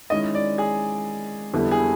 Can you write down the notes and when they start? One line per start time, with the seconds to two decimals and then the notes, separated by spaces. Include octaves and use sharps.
0.10 D#3 G#3 C#4 E4 D#5
0.35 D5
0.58 G#4
1.53 F2 D3 G3 B3 E4
1.71 G#4